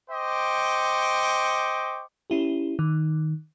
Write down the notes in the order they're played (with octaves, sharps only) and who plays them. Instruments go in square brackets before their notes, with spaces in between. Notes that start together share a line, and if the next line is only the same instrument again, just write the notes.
[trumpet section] C5 D#5 G5 C#6 D6
[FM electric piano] C#4 E4 G4
D#3